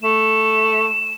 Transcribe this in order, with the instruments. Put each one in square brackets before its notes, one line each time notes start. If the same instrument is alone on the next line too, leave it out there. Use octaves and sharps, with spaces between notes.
[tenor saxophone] A3 [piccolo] E7